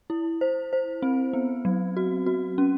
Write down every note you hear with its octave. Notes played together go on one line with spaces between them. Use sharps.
E4
C5
C5
C4
B3
F#3
F#4
F#4
C#4